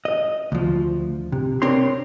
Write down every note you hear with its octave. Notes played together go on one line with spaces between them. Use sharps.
D#5
D2 F3
C3
C4 D4 A#4 C#5 C6